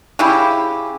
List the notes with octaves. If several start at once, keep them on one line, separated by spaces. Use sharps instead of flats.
C#3 E4 G4